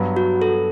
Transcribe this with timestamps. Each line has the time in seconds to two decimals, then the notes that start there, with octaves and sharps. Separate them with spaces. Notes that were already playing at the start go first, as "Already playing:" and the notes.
Already playing: G2 F#3 B3
0.17 F#4
0.42 A4